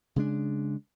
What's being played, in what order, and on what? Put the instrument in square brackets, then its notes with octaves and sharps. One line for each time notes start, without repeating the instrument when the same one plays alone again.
[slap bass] C#3 G#3 D4